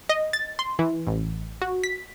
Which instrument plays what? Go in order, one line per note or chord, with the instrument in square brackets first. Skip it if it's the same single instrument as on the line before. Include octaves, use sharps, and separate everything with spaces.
[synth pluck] D#5
A6
C6
E3
A1
F#4
B6